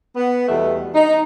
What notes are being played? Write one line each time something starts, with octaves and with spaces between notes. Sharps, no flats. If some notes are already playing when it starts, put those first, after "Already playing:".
B3
E2 B2 G3 A3
D#4